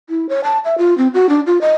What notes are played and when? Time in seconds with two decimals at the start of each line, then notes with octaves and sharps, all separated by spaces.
0.09 E4
0.29 C#5
0.44 A5
0.65 E5
0.78 F4
0.98 C4
1.14 F#4
1.29 D4
1.47 F4
1.61 D#5